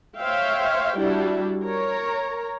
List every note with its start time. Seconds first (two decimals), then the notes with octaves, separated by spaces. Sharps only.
0.19 C5 C#5 E5 F5 G5
0.98 G3 D4 E4 F#4
1.65 A#4 C#5 A#5